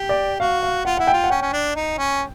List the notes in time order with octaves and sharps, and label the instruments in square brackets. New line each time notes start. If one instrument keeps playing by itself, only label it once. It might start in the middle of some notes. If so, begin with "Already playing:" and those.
Already playing: [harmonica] G4
[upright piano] D5
[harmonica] F#4 [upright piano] F5
[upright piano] F5
[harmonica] F4 [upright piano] F#5
[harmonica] E4 [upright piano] F#5
[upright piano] G5
[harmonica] F4
[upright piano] F#5
[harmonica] C#4 [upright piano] G5
[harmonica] C#4
D4
D#4
C#4